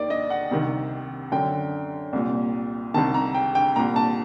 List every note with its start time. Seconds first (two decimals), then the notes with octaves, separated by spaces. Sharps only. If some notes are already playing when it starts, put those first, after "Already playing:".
Already playing: D#2 D#3 D5
0.10 D#5
0.30 F#5
0.51 C2 C3 D#3
1.32 F#2 D3 G5
2.13 C2 A#2
2.94 C2 C3 D#3 A5
3.14 A#5
3.35 G5
3.55 G5
3.76 C2 A#2 A#5
3.96 A5